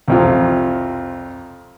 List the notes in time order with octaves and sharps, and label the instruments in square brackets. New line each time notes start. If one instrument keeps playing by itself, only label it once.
[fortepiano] C2 F2 F4